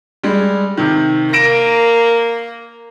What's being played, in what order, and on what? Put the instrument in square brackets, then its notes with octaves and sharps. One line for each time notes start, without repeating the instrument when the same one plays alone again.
[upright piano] G3 G#3
C3 D#3
[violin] A#3 [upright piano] A#6 D7 E7